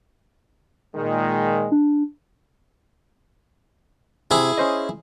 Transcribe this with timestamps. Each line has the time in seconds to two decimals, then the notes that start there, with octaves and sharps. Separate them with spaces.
0.96 A#2 D#3 G#3
1.71 D4
4.31 C3 E4 G#4
4.58 C#4 C5 D#5